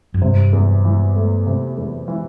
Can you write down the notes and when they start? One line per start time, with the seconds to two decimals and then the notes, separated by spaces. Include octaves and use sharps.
0.14 F#2
0.22 G2 C3
0.53 E2
0.85 E3
1.16 A3
1.46 C3
1.78 E2
2.08 E3